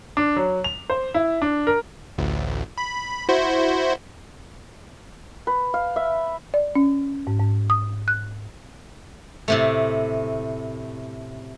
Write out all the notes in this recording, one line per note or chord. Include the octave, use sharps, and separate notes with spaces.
D4
F#3
F7
C5
E4
D4
A#4
A1 D2
B5
E4 F#4 C5
B4
F5
E5
D5
C#4
G#2
G#2
D#6
F#6
A2 C3 A3